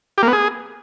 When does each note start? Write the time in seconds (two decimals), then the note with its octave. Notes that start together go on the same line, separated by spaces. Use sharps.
0.18 G4
0.23 A#3
0.28 B3
0.33 G#4